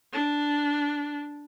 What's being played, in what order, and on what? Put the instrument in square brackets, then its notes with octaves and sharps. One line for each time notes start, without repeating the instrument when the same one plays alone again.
[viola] D4